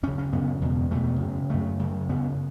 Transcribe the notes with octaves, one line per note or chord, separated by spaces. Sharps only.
F#2 C#3 C#4
C#4
F#2 C#3 B3
E2 B2
E2 B2 A3
F#2 C#3
F#2 C#3 A3
F#2 C#3
F#2 C#3 B3